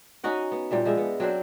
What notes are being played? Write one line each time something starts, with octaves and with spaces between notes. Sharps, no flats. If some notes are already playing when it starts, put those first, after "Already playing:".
C#4 D#4 F#4 F#5
B3
A#2 G3 D4 E5
F3 G#3 E5
B3
F#3 C4 D4 C5